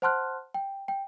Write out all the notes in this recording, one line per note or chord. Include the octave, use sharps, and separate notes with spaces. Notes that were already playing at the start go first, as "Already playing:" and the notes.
C5 F#5 A5 C6 F6 F#6
G5
G5